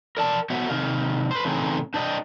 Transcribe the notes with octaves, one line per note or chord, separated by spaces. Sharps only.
A#4 D5 A5
B3 F#4 C5 C#5 E5 F#5
C3 D#3 F5
B4 C5
A2 C#3 E3 C4 D#4 G#4
D4 C5 D5 D#5 G5